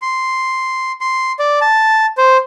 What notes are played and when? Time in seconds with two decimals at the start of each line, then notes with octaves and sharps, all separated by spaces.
0.02 C6
1.01 C6
1.39 D5
1.61 A5
2.18 C5